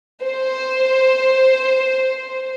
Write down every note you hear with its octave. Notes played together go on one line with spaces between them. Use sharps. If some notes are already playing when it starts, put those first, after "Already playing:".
C5